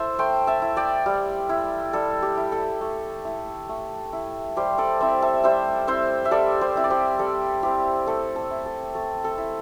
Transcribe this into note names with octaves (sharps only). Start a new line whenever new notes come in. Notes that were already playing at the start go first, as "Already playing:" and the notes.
Already playing: E4 A4 C5 E5 A5
A3 G5 C6
E5 A5
E4
D5 G5
G3
E4
G3 A4
G4
E4
A4
A3
E4
A3
E4
G3 G4 C5
A4 D5
C4 E4 C5 E5
E5 A5
G3 C5 E5
C4 E4 C5 E5
E5
G3 A4 D5
G4 C5
C4 E4
D5
G4 C5
G3 A4
C4 E4 G4
A3 A4
A4
E4
A4
A3 A4
A4
E4